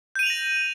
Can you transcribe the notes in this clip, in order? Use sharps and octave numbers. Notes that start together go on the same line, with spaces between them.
G6 A#6 D#7 F7 F#7